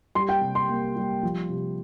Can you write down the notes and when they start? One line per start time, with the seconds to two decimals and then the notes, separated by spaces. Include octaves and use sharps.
0.15 G3 C6
0.29 G5
0.41 C3
0.55 C6
0.69 A#3
0.96 G3
1.23 F3
1.49 C3